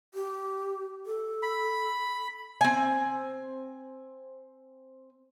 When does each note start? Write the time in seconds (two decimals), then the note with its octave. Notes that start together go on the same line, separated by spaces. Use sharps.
0.14 G4
1.06 A4
1.43 B5
2.61 C4 G#5